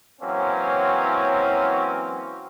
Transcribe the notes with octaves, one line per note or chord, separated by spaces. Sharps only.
E3 F#3 A#3 C4 C#4